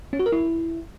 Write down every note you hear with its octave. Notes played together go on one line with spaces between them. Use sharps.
C#4
F#4
A#4
E4